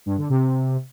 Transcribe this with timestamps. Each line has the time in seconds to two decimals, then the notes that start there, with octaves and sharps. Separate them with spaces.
0.06 G2
0.18 D3
0.29 C3